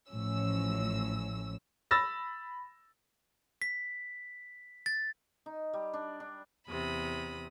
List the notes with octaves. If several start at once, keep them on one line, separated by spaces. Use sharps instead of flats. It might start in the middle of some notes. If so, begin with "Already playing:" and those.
A1 A2 F3 C#4 E6
B5 E6 A6 A#6
B6
A6
D#4
G3
D4
D4
E2 C3 B5 D#6